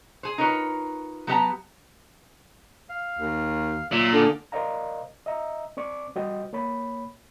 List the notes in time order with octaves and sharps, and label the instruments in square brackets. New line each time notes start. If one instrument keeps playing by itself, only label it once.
[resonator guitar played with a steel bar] G#4 C5
D#4 F4 A#4 B4 C#5
F#3 B3 G4 D#5 A5 A#5
[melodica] F5
[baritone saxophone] D#2
[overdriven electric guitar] A#2 [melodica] F#3 E5 E6
[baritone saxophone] D3 [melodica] G#4 F5
[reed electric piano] A#4 C5 D5 D#5 F5 A#5
D#5 E5 A#5
C4 D5 C#6 D6
G3 F#4 C5 D#5 G5
A#3 C#5 B5